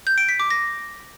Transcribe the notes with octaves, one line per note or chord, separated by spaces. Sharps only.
G6
D7
B6
D6
A#6